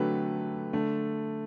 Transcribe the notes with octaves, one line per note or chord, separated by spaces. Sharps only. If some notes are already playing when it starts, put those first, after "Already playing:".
Already playing: D3 F#3 A3 G4 B4
D3 A3